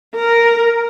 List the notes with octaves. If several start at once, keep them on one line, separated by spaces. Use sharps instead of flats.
A#4